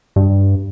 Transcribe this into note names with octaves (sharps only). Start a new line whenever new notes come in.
G2